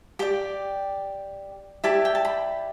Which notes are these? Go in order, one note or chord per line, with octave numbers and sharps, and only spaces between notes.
G4 D5 G5
E4 G4 D5 A5
G5
A5
B5